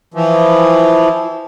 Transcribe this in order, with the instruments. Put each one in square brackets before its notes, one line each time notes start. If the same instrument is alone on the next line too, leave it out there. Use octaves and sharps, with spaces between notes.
[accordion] E3 F3